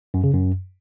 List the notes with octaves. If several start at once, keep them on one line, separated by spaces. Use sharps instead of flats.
F#2
C#3
F#2